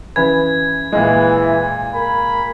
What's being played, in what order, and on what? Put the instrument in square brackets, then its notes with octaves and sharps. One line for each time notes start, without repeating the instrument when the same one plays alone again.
[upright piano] C#3 E3 B4 [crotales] G#6
[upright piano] A#2 G#3 [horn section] E3
[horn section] A#4 B5